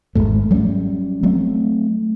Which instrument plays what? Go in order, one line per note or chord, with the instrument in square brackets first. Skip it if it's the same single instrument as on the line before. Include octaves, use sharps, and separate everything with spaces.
[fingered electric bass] G#1 D#2 G#2 A3
F#3 G3 C#4
F#3 A3 C4